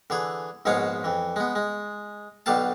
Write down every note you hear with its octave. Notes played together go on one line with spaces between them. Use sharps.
D3 E3 G#4
A#1 G#2 B2 G#3 C#5 F5
F2 E3
G#3 B3
G#3
B1 B2 D3 G4 F5 A5